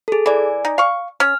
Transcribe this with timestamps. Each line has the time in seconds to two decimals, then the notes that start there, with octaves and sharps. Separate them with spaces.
0.08 G#4 A4
0.26 E3 D5 G#5
0.65 D#4
0.78 F5 C#6
1.20 C#4 F6